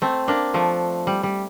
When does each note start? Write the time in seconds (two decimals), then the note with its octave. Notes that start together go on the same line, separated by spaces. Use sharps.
0.02 A3 C4
0.28 A#3 D4
0.54 F3 A3
1.07 G3
1.23 G3